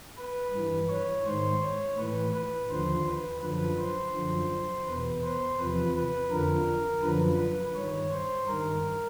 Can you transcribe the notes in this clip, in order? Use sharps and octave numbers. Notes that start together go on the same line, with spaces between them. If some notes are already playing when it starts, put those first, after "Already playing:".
B4
G2 E3
C#5
G#2 D#3 C5
C#5
A2 E3 B4
B4
D#2 D3 F3 C5
B4
F#2 D3 F3 B4
C5
F#2 D3 F3
E2 B2 B4
C5
E2 C3 F3 B4
B4
F2 D3 F3 A#4
F#2 D3 F3 B4
B4
G2 D#3 C#5
C5
G2 D#3 A#4